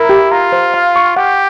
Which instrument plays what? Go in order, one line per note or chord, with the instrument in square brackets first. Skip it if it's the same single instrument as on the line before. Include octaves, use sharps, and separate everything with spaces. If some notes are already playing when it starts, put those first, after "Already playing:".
Already playing: [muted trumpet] E4 [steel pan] A#4
[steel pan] G4
[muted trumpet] F4 [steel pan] A#5
[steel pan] C5
F5
C#6
[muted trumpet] G4 [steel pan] F#5